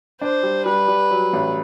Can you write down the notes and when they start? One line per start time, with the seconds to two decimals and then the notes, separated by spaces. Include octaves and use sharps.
0.21 D4 C5
0.43 G3
0.66 G3 B4
0.88 G3
1.11 F#3
1.33 A1